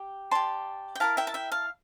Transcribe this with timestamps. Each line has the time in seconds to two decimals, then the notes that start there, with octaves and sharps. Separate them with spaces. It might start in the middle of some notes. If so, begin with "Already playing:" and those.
Already playing: G4
0.31 G4 D5 A5 C6
0.95 G5
1.00 E4 G4 A#4 F5 A5
1.17 E5 G5
1.27 A5
1.34 E5 G5
1.52 F5 A5